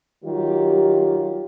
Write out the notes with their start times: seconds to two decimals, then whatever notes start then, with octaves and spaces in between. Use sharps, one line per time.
0.24 D#3 F#3 G3 F4 G4